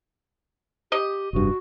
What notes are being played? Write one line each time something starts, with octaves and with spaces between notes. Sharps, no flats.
G4 D#5
F1 G2 F#4